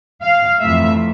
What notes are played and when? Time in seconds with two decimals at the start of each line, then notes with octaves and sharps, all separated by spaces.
0.22 F5
0.60 F2 C3 E3 A3 E5